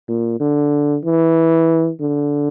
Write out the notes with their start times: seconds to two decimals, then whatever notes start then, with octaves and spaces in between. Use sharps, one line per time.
0.08 A#2
0.40 D3
1.04 E3
2.00 D3